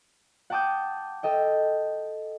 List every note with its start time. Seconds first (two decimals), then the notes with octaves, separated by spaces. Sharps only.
0.50 F#5 G5 A5 D6 D#6 G6
1.23 A4 D#5 G5